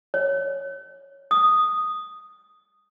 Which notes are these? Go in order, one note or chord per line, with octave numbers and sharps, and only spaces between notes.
C#5
D#6